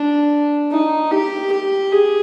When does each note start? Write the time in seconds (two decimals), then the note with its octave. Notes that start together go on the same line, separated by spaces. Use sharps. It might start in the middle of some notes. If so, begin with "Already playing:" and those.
Already playing: D4
0.71 D#4
1.12 G4
1.52 G4
1.92 G#4